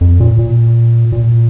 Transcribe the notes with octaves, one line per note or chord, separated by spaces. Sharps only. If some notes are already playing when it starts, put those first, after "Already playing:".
F2
A#2
A#2
A#2